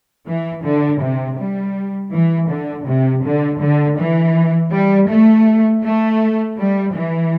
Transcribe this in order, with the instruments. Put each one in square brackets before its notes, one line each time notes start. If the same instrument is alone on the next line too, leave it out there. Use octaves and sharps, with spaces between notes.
[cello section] E3
D3
C3
G3
E3
D3
C3
D3
D3
E3
G3
A3
A3
G3
E3